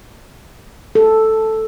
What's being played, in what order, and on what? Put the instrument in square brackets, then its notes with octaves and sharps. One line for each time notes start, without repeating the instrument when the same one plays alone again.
[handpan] A4